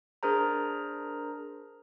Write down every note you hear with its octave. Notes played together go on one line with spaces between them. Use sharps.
D4 G#4 A#4 C5 A#5